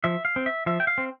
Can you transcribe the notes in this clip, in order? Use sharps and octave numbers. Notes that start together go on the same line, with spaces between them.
F3 E5
F5
C4
E5
F3 E5
G5
F5
C4